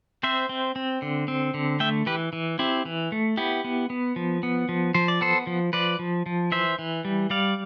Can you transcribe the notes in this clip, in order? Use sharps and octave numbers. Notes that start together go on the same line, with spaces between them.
C4 C5 E5
C4
C4
D3
C4
D3
A3 E5 G5
E3 G4 B4
E3
C4 E4 G4
E3
A3
B3 E4 G4
B3
B3
F3
B3
F3
F3 C5
D5
B3 A4 C5
F3
F3 B4 D5
F3
F3
E3 C5 E5
E3
G3
G3 D5 F5